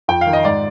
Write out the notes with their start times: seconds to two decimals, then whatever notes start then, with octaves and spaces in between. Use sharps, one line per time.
0.08 F2 G5
0.21 F5
0.26 D#3
0.33 D#5
0.45 G#2 D5